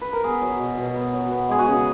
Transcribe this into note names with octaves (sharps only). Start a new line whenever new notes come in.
B4
A#4
B3 G#4
F#3
B2
B2
B3
F#3
B3
G#3 G#4
F#4
C#3